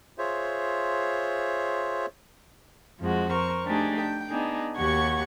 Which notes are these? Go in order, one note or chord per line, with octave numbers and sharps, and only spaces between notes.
F4 G#4 C5 C#5 E5
F2 F3 G#3 F#4
A#4 C5 C#6
A3 D4 D#4 G4 G#4
G5
B3 D4 D#4 G#4
D#2 F#4 G4 F#5 C#6 G#6